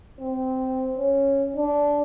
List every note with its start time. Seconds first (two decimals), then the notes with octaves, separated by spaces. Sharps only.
0.20 C4
0.98 C#4
1.56 D4